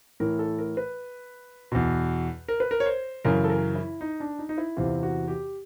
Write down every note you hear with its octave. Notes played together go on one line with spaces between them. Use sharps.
A2 E3 A#4
A4
A#4
B4
E2 B2
A#4
B4
A#4
C#5
C5
F#2 C#3 E3 A#4
A4
A#4
E4
D#4
D4
D#4
D#4
E4
E2 C3 E3 F4
F#4
G4